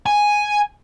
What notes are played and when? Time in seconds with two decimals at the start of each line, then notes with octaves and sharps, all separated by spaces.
0.06 G#5